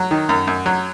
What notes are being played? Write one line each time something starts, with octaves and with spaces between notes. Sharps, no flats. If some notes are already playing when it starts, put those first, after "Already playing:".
Already playing: F#3
D#3
F#2
F#2
F#3